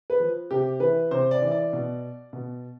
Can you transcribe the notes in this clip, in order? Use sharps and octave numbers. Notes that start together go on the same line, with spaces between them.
B4
F3
C3 G4
E3 B4
C3 C5
D5
E3
D5
B2
B2